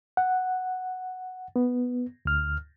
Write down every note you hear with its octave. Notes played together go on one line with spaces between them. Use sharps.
F#5
B3
D2 F6